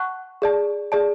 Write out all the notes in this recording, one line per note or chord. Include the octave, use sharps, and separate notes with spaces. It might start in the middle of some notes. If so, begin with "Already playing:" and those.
Already playing: F#5 A5 C#6 F#6
G#4 D5 A5
G#4 D5 A5